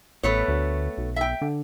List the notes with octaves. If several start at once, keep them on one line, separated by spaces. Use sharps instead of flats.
A1 A3 B3 C#5
D2
B1
E5 G5
D3